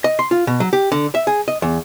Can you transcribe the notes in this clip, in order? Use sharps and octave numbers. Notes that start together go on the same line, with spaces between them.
D#5
C6
F4
B2
F#3
G4
D3
E5
G#4
D#5
E2